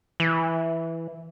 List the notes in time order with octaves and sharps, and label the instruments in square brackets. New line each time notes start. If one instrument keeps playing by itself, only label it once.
[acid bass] E3